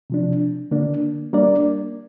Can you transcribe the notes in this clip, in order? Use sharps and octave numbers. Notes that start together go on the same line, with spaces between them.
C3 F3 D4
D3 A#3 D4
G3 A#3 D4 A#4 D5